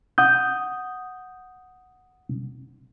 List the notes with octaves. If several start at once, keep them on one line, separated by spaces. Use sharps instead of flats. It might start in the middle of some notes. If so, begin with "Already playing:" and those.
F#5 D#6 G6